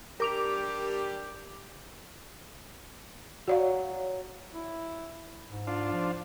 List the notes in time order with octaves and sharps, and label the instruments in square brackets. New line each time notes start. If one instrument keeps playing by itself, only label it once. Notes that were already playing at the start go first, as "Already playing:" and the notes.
[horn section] G3 D4 G4 [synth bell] A#4 D6 F7
[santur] F#3 [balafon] F#4 D5 F5
[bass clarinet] E4
G#2
[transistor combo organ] D4 F4
[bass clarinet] F3